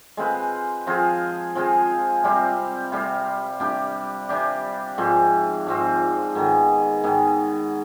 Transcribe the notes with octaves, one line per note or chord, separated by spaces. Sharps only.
G#3 C4 F4 B4
F3 C4 F4 G#4
F3 C4 F4 G#4
C3 G3 C4 F4
C3 G3 C4 F4
C3 G3 D4 G4
C3 G3 D4 G4
G#2 F3 C4
G#2 F3 C4
G#2 D#3 B3
G#2 D#3 B3